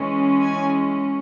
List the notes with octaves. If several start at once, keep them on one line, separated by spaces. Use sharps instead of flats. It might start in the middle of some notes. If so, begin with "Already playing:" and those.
Already playing: E3 G#3 C#4
G#5